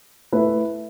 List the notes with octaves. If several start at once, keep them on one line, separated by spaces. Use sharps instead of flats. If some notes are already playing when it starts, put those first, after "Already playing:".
A3 E4 B4